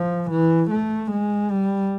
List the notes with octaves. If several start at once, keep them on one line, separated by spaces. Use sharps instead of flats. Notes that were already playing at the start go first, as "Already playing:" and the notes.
Already playing: F3
E3
A3
G#3
G3